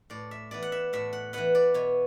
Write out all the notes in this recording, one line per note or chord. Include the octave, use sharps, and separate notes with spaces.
A2 D5
E5
E3 B3 D5
F#5
E5
A2 E5
F#5
E3 B3 F#5
D5
B2 C#5